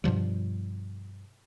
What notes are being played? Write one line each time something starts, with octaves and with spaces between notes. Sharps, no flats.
G2 B2 F3 G3